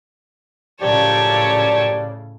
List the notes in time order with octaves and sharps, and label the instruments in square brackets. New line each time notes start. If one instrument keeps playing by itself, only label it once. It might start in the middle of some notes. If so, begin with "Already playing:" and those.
[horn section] F#2 F3 G4 [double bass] A2 C#3 [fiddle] C#5 A5 [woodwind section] D5